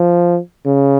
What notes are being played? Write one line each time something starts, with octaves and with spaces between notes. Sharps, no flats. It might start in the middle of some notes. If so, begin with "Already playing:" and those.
Already playing: F3
C#3